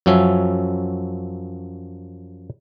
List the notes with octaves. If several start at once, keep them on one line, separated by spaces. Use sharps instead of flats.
F#2 F3 F#3 C#4 E5